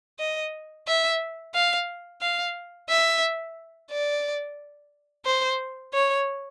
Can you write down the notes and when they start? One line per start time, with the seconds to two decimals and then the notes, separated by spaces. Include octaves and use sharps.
0.19 D#5
0.87 E5
1.55 F5
2.22 F5
2.90 E5
3.91 D5
5.25 C5
5.93 C#5